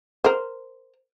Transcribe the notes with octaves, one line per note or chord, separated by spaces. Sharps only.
A#4 C5